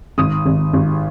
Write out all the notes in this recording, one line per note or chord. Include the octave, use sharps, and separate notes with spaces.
G#1 D#6
G#1
G#1